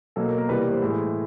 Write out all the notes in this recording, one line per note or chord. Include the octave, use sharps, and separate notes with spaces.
B2 F#3 A#3 A4
A#4
A#4
C3 E3 G3 A#3 B4
A#4
C5
A2 E3 G#3